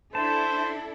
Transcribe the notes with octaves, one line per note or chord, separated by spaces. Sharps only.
D4 E4 A4 C5 A5